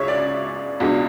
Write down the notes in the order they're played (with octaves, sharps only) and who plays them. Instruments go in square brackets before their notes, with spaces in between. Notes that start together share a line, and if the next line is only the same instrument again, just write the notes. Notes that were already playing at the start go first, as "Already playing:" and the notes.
Already playing: [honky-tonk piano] C#2 C#3 G#3 C#5 E5
D5
C#2 B2 G#3 D4